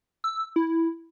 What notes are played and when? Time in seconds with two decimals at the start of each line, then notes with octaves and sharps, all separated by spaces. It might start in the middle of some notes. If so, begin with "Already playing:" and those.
0.24 E6
0.56 E4